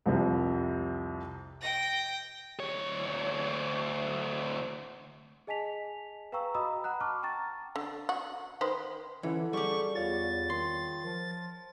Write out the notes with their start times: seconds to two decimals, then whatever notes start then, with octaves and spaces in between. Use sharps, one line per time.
0.06 C2 F2 C3
1.61 G5 A#6
2.60 D2 C#5
5.47 G#4 D#5 G#5 A5 B6 F7
6.32 B4 F5 G5 A#5 C#6 E6
6.55 F#4 D#5 A#5 B5 D#6 E6
6.84 F#5 A#5 B5 F#6
7.01 A5 C#6 D6 F6
7.23 G5 A5 A#5 C#6 A6
7.76 D3
8.09 F#4
8.61 D#3 B4 C5
9.23 D3 E3 C#4 E4 B4
9.53 G3 G#4 A4 D5 C#6
9.95 E2 F4 C#5 F5 A6
10.50 D#3 C6
11.05 F3